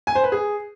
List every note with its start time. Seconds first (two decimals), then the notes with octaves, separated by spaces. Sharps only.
0.07 G#5
0.15 C5
0.24 B4
0.32 G#4